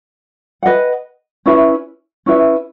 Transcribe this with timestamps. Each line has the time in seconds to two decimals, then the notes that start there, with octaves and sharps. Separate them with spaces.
0.63 B4 D#5 F#5
1.46 C#4 E4 B4 E5
2.26 C#4 E4 B4 E5